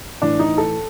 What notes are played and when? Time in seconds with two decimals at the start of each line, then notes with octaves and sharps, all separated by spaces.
0.22 A2 E3 D4
0.39 D#4
0.58 A4